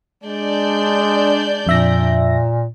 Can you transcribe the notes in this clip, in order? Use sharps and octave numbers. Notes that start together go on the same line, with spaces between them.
G#3 D4 D5 G6
F2 A#2 E5 A#6